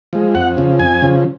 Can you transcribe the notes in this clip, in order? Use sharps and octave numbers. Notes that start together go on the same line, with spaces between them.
F3 G#3
F2 F#5
C#3 F3
F2 G#5
C#3 F3